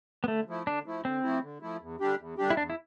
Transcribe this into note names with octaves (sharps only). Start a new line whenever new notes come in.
B3
D3 A3
F3 A3 E4
D3 D4
F3 A3 E4
D3 C4
F3 A3 E4
D3
F3 A3 E4
E2
D3 G3 D4 G4
E2
D3 G3 D4 G4
E4
E2 D4
E4